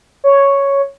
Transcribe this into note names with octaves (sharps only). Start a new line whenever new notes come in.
C#5